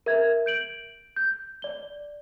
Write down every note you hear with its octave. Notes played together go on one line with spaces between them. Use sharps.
A#4 E5 G#6
G6 D7 F#7
G6
D5 G7